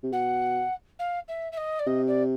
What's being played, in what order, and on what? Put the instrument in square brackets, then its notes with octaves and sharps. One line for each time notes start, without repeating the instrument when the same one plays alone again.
[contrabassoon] C3
[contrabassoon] B2 [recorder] F#5
[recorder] F5
E5
E5
D#5
D5
[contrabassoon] C3 [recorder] D#5
[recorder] D5